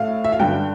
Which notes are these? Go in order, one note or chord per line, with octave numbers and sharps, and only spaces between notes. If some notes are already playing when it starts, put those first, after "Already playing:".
Already playing: A2 A3 F5
E5
F5
G2 D3 G3 G5